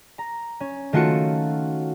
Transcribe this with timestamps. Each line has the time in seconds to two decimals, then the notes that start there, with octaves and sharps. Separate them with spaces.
0.18 A#5
0.60 C#4
0.93 D#3 A3 F4 F#4 A4 C#7